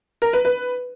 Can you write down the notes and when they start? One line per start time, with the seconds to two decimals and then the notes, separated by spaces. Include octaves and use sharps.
0.22 A#4
0.33 B4
0.45 B4